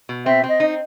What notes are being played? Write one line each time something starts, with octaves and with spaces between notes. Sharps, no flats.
B2
C4 E5
C4
D#5
D#4